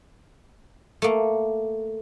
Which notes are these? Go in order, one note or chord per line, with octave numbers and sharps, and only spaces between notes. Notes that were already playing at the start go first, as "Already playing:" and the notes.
A3 A#3